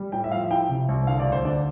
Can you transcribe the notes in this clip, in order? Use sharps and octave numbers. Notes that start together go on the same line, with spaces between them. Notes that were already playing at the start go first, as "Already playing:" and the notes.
Already playing: G3
A2 G5
E5
F3 F5
E4 G5
C3
C2
D3 F5
D5
D2
C5
D3 D5